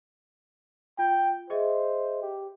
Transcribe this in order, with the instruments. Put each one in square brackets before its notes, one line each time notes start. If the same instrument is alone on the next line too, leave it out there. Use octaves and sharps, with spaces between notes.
[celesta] F4 [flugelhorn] G5
[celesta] G#4 D#5 E5 [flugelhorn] C5
[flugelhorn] G4